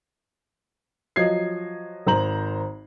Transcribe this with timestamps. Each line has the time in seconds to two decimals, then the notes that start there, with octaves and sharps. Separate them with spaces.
1.16 F3 F#3 D#5 G#6 C7
2.07 G#1 C5 A#5 F#7